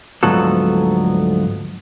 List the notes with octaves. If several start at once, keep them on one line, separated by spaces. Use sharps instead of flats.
D2 G#2 F3 F#3 B3 A4